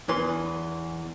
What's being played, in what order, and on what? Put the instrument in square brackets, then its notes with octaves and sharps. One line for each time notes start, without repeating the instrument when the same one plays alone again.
[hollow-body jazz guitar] E2 E3 B4 C6